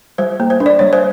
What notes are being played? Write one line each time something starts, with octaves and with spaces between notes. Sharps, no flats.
G3 C5
A#3
C5
D4
D5
G3 C#5
C5